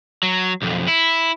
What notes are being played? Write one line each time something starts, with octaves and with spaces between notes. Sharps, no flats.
F#3
B1 F2
E4